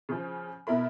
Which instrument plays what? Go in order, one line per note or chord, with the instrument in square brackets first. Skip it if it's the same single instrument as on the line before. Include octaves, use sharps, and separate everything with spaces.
[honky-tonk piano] C#3 F3
B2 E4 A#4 B5